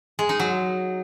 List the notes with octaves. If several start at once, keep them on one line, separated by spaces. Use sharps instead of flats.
G#3
D#4
F#3